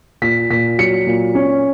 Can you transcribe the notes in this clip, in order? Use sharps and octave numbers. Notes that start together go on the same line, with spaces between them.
A#2 B6
A#2 B6
F#3 C#7
A#2
C#4